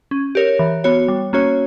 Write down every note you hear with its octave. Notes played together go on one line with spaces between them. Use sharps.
C#4
G4 A#4 C#5
E3
B3 F#4 C#5
G3
A#3 C#4 F#4 C#5